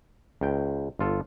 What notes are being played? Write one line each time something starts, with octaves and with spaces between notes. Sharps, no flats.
C#2 G5
G1 F4 A4